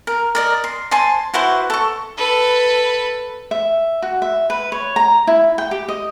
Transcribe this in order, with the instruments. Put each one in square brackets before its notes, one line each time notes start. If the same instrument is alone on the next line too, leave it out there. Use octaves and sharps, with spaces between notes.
[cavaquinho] A#4
A#4 D5 D#5
C6
C5 G#5 A5 C6
E4 F#4 B4 C5
A4 C#6
[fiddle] A4 B4
[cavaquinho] E5
F#4
E5
B4
C#5
A#5
E4
G5
G4
D#5